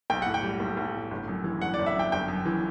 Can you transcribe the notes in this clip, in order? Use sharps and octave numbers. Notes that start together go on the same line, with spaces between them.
B1 G5
A2 F#5
G5
G3
B1
B1
A2
G1
F#2
E3
G1 F#5
D5
G1
E5
F#2 G5
G1 G5
F#2
E3